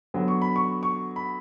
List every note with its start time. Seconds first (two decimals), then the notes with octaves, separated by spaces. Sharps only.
0.14 D3 F#3 B3
0.28 C#6
0.42 B5
0.56 C#6
0.83 C#6
1.16 B5